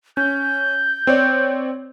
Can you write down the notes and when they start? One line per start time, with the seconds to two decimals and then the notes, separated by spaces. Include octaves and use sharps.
0.17 C#4 G6
1.07 C4 C#5 D5